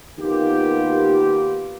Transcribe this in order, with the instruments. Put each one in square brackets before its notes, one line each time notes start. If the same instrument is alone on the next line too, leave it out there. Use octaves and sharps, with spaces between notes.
[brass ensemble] D#3 A#3 B3 F4 G4